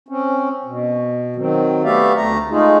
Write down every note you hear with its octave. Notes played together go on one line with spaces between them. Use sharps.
C4 C#4
B2
D#3 F#3 C4
A3 B3 G4 D5 E5 F5
D2 A3 A#5
G#3 A3 D#4 F4 G#4